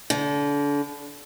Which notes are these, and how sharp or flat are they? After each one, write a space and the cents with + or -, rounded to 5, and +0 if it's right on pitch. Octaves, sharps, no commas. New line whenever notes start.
D3 -35